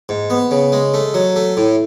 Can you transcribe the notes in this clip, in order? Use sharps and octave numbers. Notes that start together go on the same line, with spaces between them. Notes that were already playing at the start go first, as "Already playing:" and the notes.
G#2
B3
C#3
G#3
A3
F#3
A3
A2